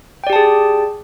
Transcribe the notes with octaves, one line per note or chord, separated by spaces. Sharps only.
G4 G#4 D5 G5 A5